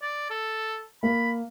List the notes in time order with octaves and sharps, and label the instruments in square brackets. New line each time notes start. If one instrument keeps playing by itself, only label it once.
[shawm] D5
A4
[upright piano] A#3 [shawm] B5